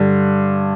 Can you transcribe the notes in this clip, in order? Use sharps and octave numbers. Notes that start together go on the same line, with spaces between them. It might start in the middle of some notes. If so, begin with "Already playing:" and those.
Already playing: G2 D3